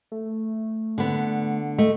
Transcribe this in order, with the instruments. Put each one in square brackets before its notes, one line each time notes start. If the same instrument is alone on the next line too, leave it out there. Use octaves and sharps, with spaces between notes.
[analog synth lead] A3
[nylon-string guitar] D3 B3
[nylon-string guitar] A3 [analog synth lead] D#5